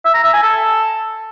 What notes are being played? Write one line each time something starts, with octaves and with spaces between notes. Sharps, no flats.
E5
A#5
E5
G#5
A4